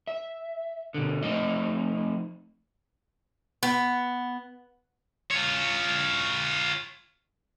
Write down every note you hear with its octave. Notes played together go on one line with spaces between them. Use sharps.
E5
B2 D3
F3 A3 C4 D#4 C5 D#5
B3
F4 C#5